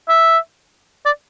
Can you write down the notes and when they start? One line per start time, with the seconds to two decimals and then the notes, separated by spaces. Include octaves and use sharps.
0.09 E5
1.06 D5